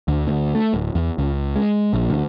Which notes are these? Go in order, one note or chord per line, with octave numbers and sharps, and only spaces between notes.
D2
D2
A3
D1
E2
C#2
G#3
A#1
D2